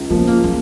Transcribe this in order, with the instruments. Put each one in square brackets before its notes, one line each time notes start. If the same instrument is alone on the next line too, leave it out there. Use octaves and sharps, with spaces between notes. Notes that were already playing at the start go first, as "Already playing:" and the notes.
Already playing: [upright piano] C#2
[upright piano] C#3 F3 A#3 [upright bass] B3
[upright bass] A#3
A#3